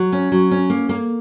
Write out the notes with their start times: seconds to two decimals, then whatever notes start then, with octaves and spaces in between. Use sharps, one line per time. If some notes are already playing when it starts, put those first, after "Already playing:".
Already playing: F#3
0.12 C#4
0.32 F#3
0.51 C#4
0.70 A#3
0.89 A#3